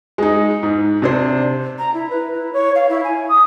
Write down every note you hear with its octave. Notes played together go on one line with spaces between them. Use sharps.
G#3 D#4
G#2
C3 D4 C5
A#5
E4
B4
E4
C#5
F5
E4
G#5
D#6